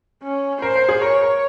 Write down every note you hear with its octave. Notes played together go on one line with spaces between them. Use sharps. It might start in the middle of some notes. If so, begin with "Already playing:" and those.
C#4
A#4 C5
A#4
G#4
A#4 C#5
A#4